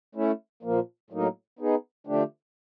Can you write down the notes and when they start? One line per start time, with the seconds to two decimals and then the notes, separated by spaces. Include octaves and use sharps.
0.15 A3 C#4 E4
0.63 A#2 F3 A#3
1.10 A2 F#3 A#3 D#4
1.59 B3 D#4 G#4
2.07 D3 F3 A3 D4 G4